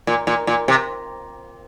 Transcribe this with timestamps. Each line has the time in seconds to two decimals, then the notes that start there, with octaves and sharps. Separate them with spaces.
0.07 A#2
0.27 A#2
0.47 A#2
0.68 C3